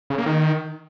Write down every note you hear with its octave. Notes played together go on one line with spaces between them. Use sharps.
C#3
A#3
D#3